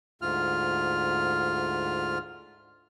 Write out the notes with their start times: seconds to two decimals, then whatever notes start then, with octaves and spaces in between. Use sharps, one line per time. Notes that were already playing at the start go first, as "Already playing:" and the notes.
0.22 D2 G#2 F4 F6